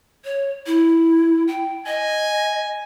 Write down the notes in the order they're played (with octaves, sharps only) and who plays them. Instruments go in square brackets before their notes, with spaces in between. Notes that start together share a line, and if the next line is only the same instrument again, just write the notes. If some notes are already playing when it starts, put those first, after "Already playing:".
[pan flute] C#5
E4
G5
[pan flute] D#5 [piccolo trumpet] G#5